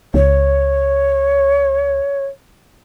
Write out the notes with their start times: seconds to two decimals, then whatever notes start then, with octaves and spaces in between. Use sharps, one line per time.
0.14 C#2 C#5